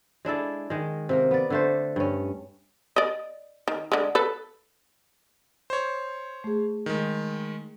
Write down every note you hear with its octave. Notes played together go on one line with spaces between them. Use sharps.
G#3 D4 E4 A4
D#3 G#3
C3 A#3 A#4
B3 D5
D3 A3 C5
G2 C#4
D5 D#5
D#3
D3 G#3
A4 B4
C5 C#5
A3 G#4
D#3 G#3